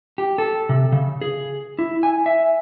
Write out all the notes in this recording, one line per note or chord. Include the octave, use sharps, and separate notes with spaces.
G4
A4
C3
C#3
G#4
E4
G#5
E5